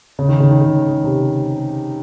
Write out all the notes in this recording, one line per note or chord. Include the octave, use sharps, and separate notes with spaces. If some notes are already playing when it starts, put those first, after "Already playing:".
C#3
D#3
C#3
D#3
C#3
C3